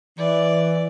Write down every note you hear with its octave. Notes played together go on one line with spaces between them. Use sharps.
E3 D5